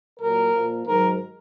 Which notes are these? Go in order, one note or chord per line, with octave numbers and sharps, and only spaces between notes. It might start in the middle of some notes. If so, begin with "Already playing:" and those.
A#2 F#3 A#4
A#2 F3
G#2 D#3 F#3 A#4